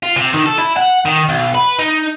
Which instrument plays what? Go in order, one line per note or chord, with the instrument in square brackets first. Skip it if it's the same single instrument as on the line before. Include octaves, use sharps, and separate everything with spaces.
[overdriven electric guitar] F4
C3
D#3
A4
E4
F#5
D#3
B1
B4
D#4